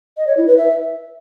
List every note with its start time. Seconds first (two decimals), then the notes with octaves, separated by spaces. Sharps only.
0.17 D#5
0.27 C#5
0.37 E4
0.47 B4
0.57 E5